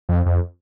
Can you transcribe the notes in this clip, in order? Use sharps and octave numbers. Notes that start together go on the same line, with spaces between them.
F2
F2